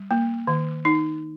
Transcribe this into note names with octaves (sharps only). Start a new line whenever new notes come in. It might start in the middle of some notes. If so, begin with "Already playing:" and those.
Already playing: G3
A#3
D#3
D#4